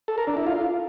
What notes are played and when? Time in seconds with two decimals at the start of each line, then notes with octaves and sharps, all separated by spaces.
0.08 A4
0.18 A#4
0.27 D4
0.37 E4
0.46 F4